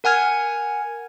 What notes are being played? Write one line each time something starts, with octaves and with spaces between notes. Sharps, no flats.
A#4 F#5 G#5 F6 G#6